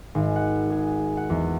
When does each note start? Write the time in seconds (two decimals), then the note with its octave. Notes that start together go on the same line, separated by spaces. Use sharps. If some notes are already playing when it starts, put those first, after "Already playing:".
0.15 G#1
0.36 F#5
0.70 G#4
1.17 F#5
1.30 E2